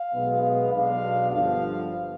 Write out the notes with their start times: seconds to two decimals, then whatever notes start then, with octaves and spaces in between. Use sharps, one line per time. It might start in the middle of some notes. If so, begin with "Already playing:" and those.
Already playing: F5
0.13 B1 B2 G#3 B3
0.43 F5
0.73 B1 B2 G#3 D4 F5
1.32 G1 G2 D3 F3 B3 F5